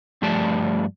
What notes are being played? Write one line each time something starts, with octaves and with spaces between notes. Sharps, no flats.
G2 F3 A3 G4 D5 A5